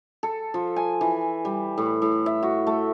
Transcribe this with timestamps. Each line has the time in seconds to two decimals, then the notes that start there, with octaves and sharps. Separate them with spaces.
0.23 A4
0.54 F3
0.76 G#5
1.01 E3
1.45 G3
1.78 A2
2.02 A2
2.26 E5
2.43 F#4
2.67 A3